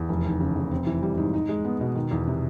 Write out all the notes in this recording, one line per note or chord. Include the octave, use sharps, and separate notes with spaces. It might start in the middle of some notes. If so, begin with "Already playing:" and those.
Already playing: E2
F1
D#2
C#3
F1
C4
E3
G3
G#2
D#4
G#3
B3
B2
D#3
E2
C3